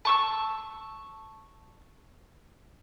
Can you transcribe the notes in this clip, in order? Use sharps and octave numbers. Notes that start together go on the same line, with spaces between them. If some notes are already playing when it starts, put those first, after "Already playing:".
A5 C#6 E6